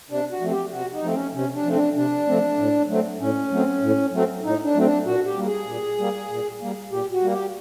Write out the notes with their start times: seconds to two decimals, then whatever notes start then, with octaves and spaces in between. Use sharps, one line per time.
0.10 C3 D4
0.31 F#4
0.40 F3 A3 C4
0.51 G4
0.71 C3 F#4
0.93 D#4
1.02 F3 A3 C4
1.13 C#4
1.33 C3 C#4
1.54 D4
1.64 F3 A3 C4
1.75 D4
1.96 C3 D4
2.27 F3 A3 C4
2.57 A2
2.88 F#3 A3 C4
3.19 A2 C#4
3.51 F#3 A3 C4
3.81 A2
4.12 F#3 A3 C4
4.43 A2 D#4
4.64 D4
4.74 F#3 A3 C4
4.84 D4
5.04 A#2 F#4
5.25 G4
5.36 G3 A#3
5.46 G#4
5.66 A#2
5.98 G3 A#3
6.29 A#2
6.60 G3 A#3
6.90 A#2 G4
7.12 F#4
7.22 G3 A#3
7.32 G4